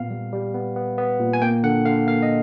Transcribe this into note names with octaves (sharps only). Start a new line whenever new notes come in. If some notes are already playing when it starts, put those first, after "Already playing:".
Already playing: A#2 B3 F5
G3
G3
B3
B3
B3
A#2
G#5
A#3 G5
D3 F#5
D3 F5
A#3 F5
D#5